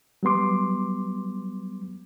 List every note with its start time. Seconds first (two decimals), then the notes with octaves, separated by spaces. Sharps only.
0.23 F#3 G3 B3 C6 D6